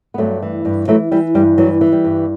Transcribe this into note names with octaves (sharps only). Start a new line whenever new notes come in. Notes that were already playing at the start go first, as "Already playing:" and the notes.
B3
G2 F#3 A3
E3
G2
E3 F#3 A3
E3 G3
G2 G3
E3 F#3
E3
G3
G2